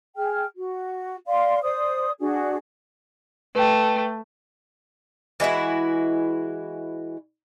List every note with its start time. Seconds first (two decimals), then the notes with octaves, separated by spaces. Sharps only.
0.16 G#4 G5 F6
0.56 F#4
1.27 D5 F5 C6
1.62 C5 D5 D#6
2.20 D4 F#4 G#4
3.55 A3 B4 G5
5.40 E3 G#3 E4 F#4